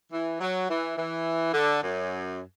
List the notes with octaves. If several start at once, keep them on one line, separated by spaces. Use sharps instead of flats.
E3
F#3
E3
E3
D3
F#2